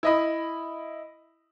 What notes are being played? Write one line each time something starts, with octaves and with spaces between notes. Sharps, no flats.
E4 D#5 B5